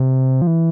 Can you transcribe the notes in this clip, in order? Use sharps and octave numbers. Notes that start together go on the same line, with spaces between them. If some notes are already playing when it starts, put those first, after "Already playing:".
Already playing: C3
F3
E3